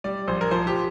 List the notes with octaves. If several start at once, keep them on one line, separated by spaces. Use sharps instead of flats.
G3 D5
A#1 C5
A#4
F3 C5
G4